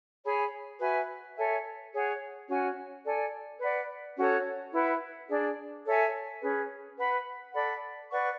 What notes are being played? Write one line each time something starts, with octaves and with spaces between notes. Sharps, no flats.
G#4 C#5 G#5 B5
F#4 B4 E5 G#5
A4 C#5 E5 G#5
G#4 C#5 F#5
C#4 F#4 C#5 G#5
A4 D5 G#5
B4 D5 F#5
C#4 F#4 A4 C#5
E4 B4 F#5
D4 G#4 D5
A4 C#5 E5 G#5
C#4 G#4 B4
B4 F#5 B5
A4 D5 F#5 B5
B4 D5 F#5 C#6